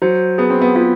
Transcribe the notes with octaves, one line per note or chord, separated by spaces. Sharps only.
F#3 C5
B3 G#4
C4
B3
B3 F4